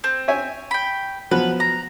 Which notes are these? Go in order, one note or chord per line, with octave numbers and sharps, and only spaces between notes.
C4
C#5 E5 G#5
G5 B5
F3 F#3 B3 B4
A#5